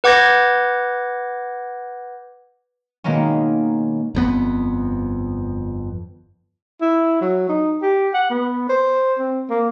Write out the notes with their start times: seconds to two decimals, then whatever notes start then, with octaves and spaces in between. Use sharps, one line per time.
0.04 B4 F#5 D6 G6 G#6 A#6
3.04 B2 D#3 G#3 A#3 B3 C#4
4.15 G1 F2 B3
6.81 E4
7.21 F#3
7.49 D#4
7.82 G4
8.14 F#5
8.30 B3
8.69 C5
9.19 C4
9.50 A#3